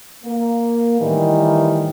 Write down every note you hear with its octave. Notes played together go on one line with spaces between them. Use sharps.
A#3
A2 D#3 E3 G3